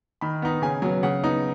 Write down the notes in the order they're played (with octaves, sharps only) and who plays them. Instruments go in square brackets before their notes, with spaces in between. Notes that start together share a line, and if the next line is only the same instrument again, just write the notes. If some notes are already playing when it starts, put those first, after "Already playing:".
[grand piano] D#3 B5
B3 D#4
C#3 G#5
F#3 B3
C#3 F#5
B3 D#4